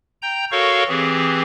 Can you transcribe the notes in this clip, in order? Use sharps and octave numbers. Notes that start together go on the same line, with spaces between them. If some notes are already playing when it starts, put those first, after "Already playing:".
G5 A#5 G6
F#4 A4 A#4 C#5 F5 C#6
E3 C4 G4 G#4